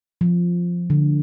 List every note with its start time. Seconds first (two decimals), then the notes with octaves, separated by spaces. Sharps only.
0.21 F3
0.90 D3